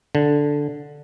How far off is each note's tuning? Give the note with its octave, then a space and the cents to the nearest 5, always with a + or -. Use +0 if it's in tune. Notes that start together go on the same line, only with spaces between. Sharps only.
D3 -5